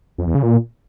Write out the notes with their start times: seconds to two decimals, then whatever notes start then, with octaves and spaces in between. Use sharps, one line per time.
0.18 F2
0.27 E2
0.35 C#3
0.43 A#2